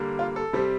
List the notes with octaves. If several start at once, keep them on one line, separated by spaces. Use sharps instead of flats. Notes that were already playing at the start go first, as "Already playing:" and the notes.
Already playing: D3 G3 A#3
F4
A4
C3 G3 C4